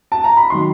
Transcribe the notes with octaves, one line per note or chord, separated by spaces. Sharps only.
A5
A#5
B5
D#3 F#3 C6